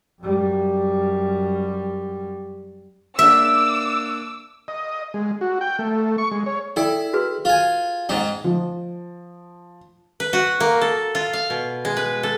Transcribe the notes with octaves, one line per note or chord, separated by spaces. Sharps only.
F#2 G3
A#3 D4 E5 D6 E6
D#5
G#3
F#4
G5
A3
C#6
G#3
C#5
E4 A4 D5 G5
F#4 G#4 B4
F4 G#5
G#2 D#4 D#5 F#5 G5
F3
B4
F#4
A#3
A4
F4
F5
B2
G#3
B4
A4